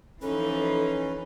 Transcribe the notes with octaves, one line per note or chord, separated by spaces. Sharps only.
E3 F3 C#4 D#4 A4 B4